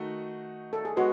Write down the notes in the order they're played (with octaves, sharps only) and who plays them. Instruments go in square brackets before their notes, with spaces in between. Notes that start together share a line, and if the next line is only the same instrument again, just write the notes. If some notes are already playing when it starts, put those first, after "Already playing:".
Already playing: [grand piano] D#3 A3 D#4 F#4
[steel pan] A4
G#4
[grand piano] G#3 B3 [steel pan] F#4